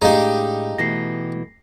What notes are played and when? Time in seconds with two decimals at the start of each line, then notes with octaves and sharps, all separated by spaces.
0.02 A2 G#3 D4 D#4 G4 G#4 D#5 F5
0.78 B2 E3 A3 A#6 C7